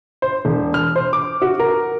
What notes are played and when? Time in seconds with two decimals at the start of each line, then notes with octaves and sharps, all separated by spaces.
0.22 C5
0.45 E1
0.74 F6
0.96 C5
1.13 D6
1.42 F#4
1.60 A#4